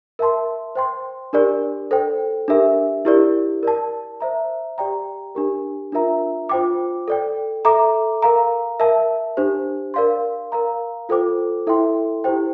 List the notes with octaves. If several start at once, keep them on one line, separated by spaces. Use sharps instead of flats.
A#4 E5 A5 C6
C5 G5 C6
D4 G4 A#4 D5
A4 C5 G5
D4 G4 A#4 E5
E4 G4 A#4 D5
A#4 D5 A5
C5 E5 A#5
G4 D5 G5 A#5
D4 G4 A#4
D4 F4 A#4 E5 A#5
F4 C5 G5 D6
A4 D5 G5
A4 E5 A#5 D6
A#4 F5 A#5
A#4 E5 A5
D4 G4 C5
A#4 D5 F5 C6
A#4 F5 A#5
F4 A4 C5 G5 D6
E4 A4 E5 G5 C6
E4 G4 C5 G5